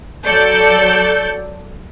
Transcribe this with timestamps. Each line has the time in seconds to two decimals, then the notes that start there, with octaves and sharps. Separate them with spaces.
0.24 F#3 A4 D5 G6 C#7